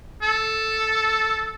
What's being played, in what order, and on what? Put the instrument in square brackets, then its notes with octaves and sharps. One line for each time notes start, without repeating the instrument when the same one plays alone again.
[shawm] A4